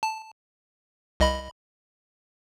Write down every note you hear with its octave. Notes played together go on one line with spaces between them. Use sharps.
A5
C2 D#5 B5